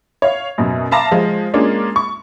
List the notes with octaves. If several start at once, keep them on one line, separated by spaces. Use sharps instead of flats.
C#5 F5
F#2 B2
E5 F5 A5 A#5 D6 A#6
F3 G#3 F5
G#3 A#3 C#4 D4 F4
C#6